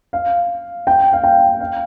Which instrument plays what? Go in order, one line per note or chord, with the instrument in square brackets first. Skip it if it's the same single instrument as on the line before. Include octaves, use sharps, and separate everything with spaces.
[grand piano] F5
G5
F5
G5
F5